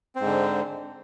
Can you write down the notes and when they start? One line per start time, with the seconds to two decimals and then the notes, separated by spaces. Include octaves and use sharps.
0.15 C4
0.20 G#2
0.25 D3